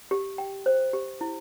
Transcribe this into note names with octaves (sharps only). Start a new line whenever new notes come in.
G4
G5
C5
G4
E4